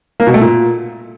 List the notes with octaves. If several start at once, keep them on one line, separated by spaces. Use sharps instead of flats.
A#3
B2
A3
A#2